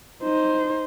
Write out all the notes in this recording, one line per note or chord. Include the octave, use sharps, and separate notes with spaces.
D#4 C5